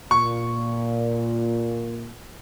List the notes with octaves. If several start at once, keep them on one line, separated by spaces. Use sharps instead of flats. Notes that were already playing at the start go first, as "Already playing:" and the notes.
A#2 C#6